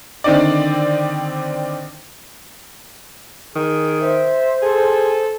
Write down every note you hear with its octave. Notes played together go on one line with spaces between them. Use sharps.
D3 D#3 C4 D#4 D5
D#3 G#4
C5 E5
G#4 A4